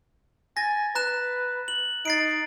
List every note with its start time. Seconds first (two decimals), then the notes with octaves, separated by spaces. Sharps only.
0.57 G#5 A6 A#6
0.95 B4 A#5 F#6 E7
1.68 F#7
2.05 D#4 A6 C7 D7